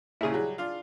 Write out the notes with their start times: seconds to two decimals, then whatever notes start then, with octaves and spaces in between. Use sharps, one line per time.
0.21 D#2 A#2 C#3 E4 G#4
0.32 F#3 G3
0.58 D4 F4 F5